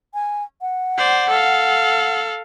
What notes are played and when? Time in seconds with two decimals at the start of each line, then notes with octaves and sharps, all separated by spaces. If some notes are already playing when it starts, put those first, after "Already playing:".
0.14 G#5
0.61 F#5
0.98 C5 D5
1.30 A4 F5